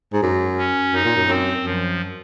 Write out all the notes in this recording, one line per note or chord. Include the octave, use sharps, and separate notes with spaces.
G#2
F#2
C#4
F#2 D#4
A#2
F#2
F#2 C4
F#2 F3